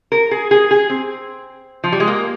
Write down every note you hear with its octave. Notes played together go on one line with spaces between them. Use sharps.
A#4
G#4
G#4
G#4
C4
F3
G3
G#3
A#3